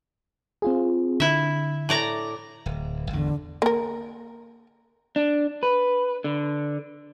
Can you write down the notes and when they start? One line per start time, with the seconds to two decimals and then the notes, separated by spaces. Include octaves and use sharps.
0.62 C4 F4 G#4
1.20 D3 E4 E5
1.89 A2 D5 A#5
2.66 D1
3.11 G#1 E2 D3
3.62 A#3 A#4
5.16 D4
5.63 B4
6.24 D3